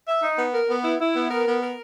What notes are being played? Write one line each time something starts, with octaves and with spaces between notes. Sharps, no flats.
E5
D#4
B3
A#4
B3
E4
E4
B3
A#4
B3
A#4